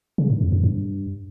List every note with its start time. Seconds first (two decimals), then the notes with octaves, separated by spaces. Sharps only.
0.18 C#3
0.30 G#2
0.41 F2
0.52 F#2
0.63 G2